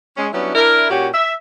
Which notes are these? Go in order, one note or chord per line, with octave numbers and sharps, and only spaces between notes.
G#3 C#4
F#3 G3 B3 C#4 D4 E4
D4 E4 A#4
A#2 A#3 C#4 F#4 G4
E5